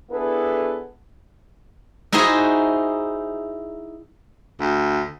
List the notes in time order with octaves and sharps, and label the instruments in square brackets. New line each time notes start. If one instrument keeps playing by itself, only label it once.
[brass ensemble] B3 D4 E4 G#4 A4 B4
[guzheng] D#4 E4 F#4 G#4 C5 D#5
[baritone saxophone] D2